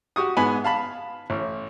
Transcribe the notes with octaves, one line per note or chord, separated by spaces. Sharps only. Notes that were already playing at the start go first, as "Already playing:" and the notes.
F#4 G4 C#6 D#6
G#2 B3 G#5 B5
F5 A5 B5
A1